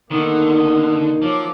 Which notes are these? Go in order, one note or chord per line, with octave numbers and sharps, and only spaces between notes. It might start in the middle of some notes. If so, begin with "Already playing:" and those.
D3 D#3 A#3 B3 D#4 D#6
F3 F#3 D6